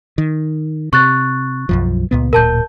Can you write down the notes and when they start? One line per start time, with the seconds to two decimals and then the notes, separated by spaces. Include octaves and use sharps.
0.18 D#3
0.93 C3 C#6 F#6 A6
1.69 B1 F#2 F3
2.11 C#2 A#2 B3
2.33 D1 A#2 A#4 A5 G6